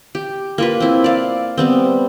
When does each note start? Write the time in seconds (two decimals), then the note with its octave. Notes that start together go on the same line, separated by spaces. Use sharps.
0.15 G4
0.58 A#3 F4 B4
0.80 C4 E4
1.04 D5 F5
1.58 G3 B3 C4